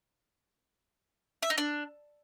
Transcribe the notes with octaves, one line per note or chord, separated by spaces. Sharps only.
E5
D#4
D4